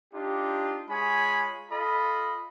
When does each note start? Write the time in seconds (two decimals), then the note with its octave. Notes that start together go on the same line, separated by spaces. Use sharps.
0.13 D4 D#4 F4 G4
0.89 G#3 F4 G#4 C#5 G#5 B5
1.70 F4 A4 D#5 B5